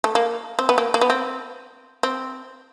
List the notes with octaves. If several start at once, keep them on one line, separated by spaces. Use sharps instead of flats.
A3
A#3
C4
B3
A#3
A#3
B3
C4
C4